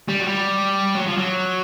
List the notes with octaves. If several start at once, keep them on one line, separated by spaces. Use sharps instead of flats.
G3
F#3
G3
F#3
F3
F#3